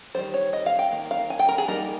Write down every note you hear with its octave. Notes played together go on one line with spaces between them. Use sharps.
D#3 G3 C#4 C5
C#5
D#5
F5
G5
D#3 A#3
F5
G#5
G5
A#4
G#4
G3 A#3 D#4 A#4